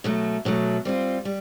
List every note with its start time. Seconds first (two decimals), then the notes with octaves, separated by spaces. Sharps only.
0.04 B2 F#3 A3
0.45 B2 F#3 A3
0.85 G3 C4 F4
1.25 G3